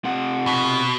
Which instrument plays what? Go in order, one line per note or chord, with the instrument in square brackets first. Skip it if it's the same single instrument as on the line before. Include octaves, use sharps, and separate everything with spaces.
[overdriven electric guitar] C3 F#5
[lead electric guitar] B2